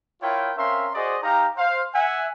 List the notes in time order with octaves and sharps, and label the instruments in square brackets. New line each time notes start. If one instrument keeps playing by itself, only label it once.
[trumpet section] E4 F4 A#4 C#5 G5
C4 C#4 A#4 E5 F5 C6
F#4 G#4 C5 D5 D#5
D#4 G4 F5 A#5
C5 F5
E5 F#5 G#5